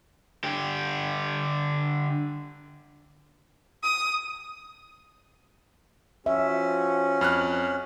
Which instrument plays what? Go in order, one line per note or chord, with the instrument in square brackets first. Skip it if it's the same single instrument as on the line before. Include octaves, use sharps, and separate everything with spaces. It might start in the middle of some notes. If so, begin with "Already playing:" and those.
[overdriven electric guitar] D3 G4
[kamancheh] D#6
[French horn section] F3 F#4 [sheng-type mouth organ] C#4 [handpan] E5
[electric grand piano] F2 F6 F#6